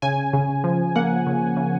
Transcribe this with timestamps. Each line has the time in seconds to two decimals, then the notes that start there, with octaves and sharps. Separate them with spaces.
0.02 C#3 G#5
0.33 C#3
0.64 F3
0.96 A#3 F#5
1.26 C#3
1.57 C#3